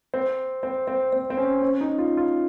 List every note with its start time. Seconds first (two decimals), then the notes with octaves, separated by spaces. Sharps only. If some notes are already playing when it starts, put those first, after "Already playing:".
0.14 C4
0.63 C4
0.88 C4
1.13 C4
1.30 C4
1.37 C#4
1.62 C#4
1.81 D#4
1.99 F4
2.17 F4